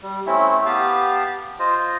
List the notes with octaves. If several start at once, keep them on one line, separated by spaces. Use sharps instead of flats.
G3
A3 C4 C#4 E4
B3 G4 F5 A5
F4 C5 D#5